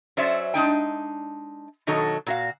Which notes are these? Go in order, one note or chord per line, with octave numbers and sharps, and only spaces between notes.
F#3 C#4 C5 D5 E5
G#3 D4 D#4 G5
B2 D#3 F#3 D#4 A4 D#5
A#2 F#4 F5